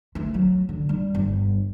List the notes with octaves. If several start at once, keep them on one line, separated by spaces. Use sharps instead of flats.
A3
F#3
D3
G3
G1